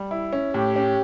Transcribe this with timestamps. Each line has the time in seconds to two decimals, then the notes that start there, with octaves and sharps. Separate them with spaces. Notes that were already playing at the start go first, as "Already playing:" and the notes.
Already playing: G3
0.11 E4
0.33 C#4
0.54 A2 G4
0.76 C#4